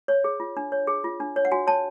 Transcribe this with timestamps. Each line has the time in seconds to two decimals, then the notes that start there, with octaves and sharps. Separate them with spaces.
0.08 C#5
0.24 G#4
0.40 F4
0.57 D4
0.72 C#5
0.87 G#4
1.04 F4
1.20 D4
1.36 C#5
1.45 F#5
1.52 F#4 G#5
1.67 C#5 A5